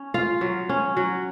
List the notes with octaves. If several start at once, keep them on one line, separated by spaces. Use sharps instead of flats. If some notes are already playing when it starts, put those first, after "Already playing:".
Already playing: C#4
F4 F5
F#3
C#4
F#3